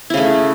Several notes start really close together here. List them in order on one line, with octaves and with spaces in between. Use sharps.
E4 C#3 A3